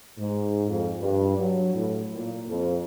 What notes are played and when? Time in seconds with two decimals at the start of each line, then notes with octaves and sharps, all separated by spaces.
0.18 G#2
0.68 F2
1.00 G2
1.38 F#3
1.74 A2
2.15 A#2
2.48 F2